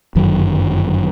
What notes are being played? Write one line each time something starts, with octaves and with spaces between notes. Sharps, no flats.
G1 F#2 D#3 F#3